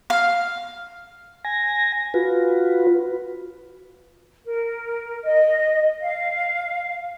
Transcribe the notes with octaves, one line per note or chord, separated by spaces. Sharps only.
F5
G#5 A#6
F4 F#4 B4
A#4
D#5
F5